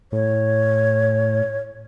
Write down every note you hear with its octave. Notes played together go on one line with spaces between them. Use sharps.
A2 C#5